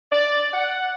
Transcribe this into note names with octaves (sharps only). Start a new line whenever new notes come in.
D5
F#5